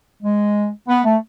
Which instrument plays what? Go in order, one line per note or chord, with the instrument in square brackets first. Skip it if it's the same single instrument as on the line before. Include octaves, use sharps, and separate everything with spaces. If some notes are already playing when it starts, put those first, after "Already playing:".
[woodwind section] G#3
B3
A3